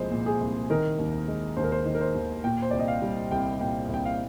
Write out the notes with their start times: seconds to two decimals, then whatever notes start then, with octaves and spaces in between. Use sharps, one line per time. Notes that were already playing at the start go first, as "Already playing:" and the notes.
Already playing: C2 A#2 F3 G#3 C5
0.11 A#2
0.26 G#4
0.41 C2
0.70 D#3 A#4
0.99 D#2
1.28 G#3
1.57 D#2 C5
1.64 A#4
1.72 C5
1.85 D#3
1.95 A#4
2.01 C5
2.15 D#2
2.44 A#2 G5
2.62 C5
2.71 C2 D5
2.79 D#5
2.88 F5
3.02 G3
3.31 C2 G5
3.60 A#2 G5
3.89 C2 G5
4.06 F5